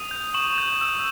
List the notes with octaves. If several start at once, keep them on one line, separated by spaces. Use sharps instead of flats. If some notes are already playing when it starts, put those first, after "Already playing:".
Already playing: D#6 D#7 F7
G6
C#6 E7 F#7
G6
E6